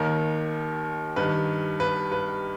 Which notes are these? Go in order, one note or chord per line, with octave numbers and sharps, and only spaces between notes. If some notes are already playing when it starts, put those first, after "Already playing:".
Already playing: D#2 D#3 A#4
G2 D#3 B4
B4
B4